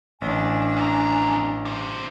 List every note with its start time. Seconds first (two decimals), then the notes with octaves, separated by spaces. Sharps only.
0.22 A1 D4 G#5
0.77 F2 A#5
1.65 D4 C5